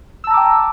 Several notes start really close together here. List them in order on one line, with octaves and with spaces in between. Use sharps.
E6 A5 A#5 D6 G5